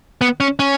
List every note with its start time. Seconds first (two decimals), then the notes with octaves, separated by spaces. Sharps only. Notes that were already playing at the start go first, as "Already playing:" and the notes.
0.21 B3
0.40 C#4
0.59 C#4